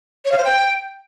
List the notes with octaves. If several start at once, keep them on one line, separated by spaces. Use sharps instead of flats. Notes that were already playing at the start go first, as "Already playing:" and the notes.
C#5
F5
C5
G5